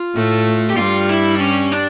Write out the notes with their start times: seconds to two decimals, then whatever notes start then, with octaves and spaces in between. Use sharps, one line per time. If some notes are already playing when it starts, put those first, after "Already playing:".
Already playing: F4
0.15 A2 A3
0.70 G4
0.77 G2 G3 F4
1.09 E4
1.35 D4
1.40 C#4
1.72 D4